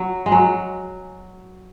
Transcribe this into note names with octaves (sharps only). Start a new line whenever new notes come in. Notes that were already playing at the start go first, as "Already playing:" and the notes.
Already playing: F#3
G#3
F#3